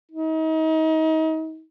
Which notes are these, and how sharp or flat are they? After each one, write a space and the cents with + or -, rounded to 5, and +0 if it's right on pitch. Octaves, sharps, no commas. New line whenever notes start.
D#4 +35